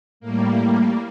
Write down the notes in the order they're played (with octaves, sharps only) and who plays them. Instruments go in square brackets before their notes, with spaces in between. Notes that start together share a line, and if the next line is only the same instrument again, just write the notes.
[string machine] A2 G3 A#3